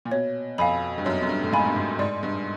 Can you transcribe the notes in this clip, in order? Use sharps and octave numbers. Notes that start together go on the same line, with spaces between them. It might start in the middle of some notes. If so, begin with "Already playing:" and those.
A#2
B2 C#5
F2 F5 G#5 B5
G2
F#2 C#5
F#2
G2
A2
G#2 F5 G#5 B5
G2
G#2
G#2 D5
G2